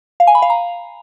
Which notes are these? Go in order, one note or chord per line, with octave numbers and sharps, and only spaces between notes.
F5
G#5
B5
F5
A#5